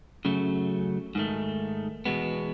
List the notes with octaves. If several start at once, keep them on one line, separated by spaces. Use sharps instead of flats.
F#2 C#3 F#3 A3
G#2 D#3 A3
E2 B2 G#3 B3